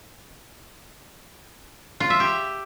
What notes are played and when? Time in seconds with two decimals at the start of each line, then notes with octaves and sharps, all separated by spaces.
2.00 F4
2.10 E5
2.20 G4